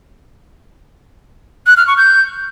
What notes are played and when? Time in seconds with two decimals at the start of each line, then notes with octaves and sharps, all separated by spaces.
1.67 F#6
1.77 F6
1.87 C#6
1.98 G6